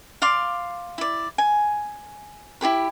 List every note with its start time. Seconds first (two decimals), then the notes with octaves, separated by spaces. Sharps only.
0.22 D5 F5 C6 D6
0.98 E4 D5
1.38 G#5
2.61 E4 G4 G#4 B5